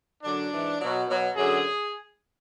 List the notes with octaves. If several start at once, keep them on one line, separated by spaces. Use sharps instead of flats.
F#2 D3 F#3 D4
G#2 E3
B2 F#3
B2 F#3
F#2 D3 F#3 G#4